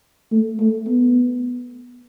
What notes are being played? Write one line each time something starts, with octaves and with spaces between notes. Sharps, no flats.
A3
A3
B3